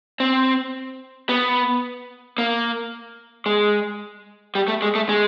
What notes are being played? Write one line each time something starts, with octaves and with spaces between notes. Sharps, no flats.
C4
B3
A#3
G#3
G3
A3
G#3
A3
G#3